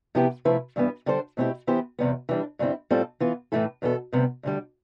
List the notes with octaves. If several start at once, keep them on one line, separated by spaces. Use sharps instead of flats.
C3 F3 B3 E4 G4
C3 F3 A3 E4 B4
G2 E3 G3 B3
D3 G3 D4 A4 C5
B2 A3 C4 E4 G4
E3 B3 E4 G4 C5
E2 C3 G3 B3
E3 G3 D4
G2 D3 G3 C4 E4
A2 G3 C4 F4 A4
E3 B3 F4
A2 E3 A3 E4 A4
E2 B2 B3 F4 A4
D2 C3 G3 B3
D2 D3 G3